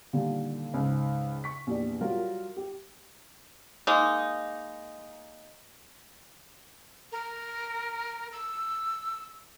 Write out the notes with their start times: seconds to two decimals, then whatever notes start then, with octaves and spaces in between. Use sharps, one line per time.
0.13 A#2 D3 D#3 G3
0.74 C#2 G#2
1.44 C#6 B6
1.67 A#1 E2 G4 D5
2.01 F#3 G3 F4 A#4
2.57 G4
3.87 G#3 A#3 D#4
7.12 A#4
8.32 E6